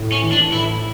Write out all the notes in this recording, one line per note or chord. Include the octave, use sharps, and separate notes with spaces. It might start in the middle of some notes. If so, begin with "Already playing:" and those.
Already playing: A2
C#4
E3
D4
A2 E4